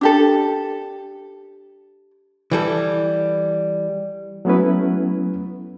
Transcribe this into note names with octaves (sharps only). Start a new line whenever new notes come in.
D4 G4 A4
E3 G3 A4
F#3 A3 B3 C#4 E4 B4